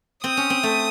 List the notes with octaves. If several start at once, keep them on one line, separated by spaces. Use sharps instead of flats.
C4 D#6
C#4
C4
A3